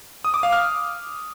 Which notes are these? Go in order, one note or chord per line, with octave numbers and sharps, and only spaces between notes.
D#6
D6
F5
F6